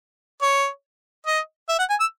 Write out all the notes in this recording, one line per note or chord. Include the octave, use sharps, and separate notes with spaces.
C#5
D#5
E5
F#5
G#5
E6